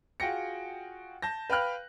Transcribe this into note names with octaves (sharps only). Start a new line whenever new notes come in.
F4 F#4 G#4 G5 A#6 C#7
A5 G6 A#6
B4 F5 G5 B5 F6 F#6